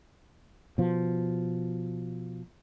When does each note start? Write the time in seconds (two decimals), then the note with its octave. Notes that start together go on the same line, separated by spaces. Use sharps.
0.78 B2 F3